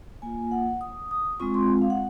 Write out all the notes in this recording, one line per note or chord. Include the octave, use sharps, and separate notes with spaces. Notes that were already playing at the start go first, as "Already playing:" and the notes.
A#3 F4 G#5
F#5
D#6
D#6
G#3 C4 F4 C#6
C6
F5
F#5